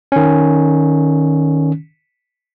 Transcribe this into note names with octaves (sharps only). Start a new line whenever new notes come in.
D#3 C#4